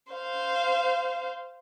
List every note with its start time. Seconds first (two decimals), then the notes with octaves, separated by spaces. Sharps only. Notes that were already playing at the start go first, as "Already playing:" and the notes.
0.12 C5 F5